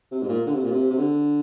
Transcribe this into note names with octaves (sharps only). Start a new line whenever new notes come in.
C3
G#2
A#2
D3
C3
A#2
C3
C3
D3